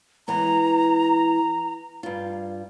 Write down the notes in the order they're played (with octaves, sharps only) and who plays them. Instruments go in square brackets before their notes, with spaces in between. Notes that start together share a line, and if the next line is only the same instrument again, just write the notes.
[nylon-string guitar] E3 G#3 B3 [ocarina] A#5
[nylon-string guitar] G2 F4